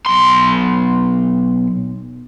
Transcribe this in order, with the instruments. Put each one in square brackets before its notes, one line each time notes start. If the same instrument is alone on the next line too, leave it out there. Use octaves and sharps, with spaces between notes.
[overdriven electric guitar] B1 C6